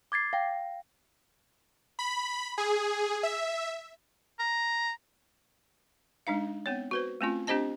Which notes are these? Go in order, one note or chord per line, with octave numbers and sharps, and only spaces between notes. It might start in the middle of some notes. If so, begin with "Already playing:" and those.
D6 G#6 A6 C7
F5 G5
B5
G#4
E5
A#5
G#3 D4 D#4 F5
B3 C4 C#5
F#4 B4 C5
A3 C4 C#4 F4
C4 D4 G4 C5 D#5 A5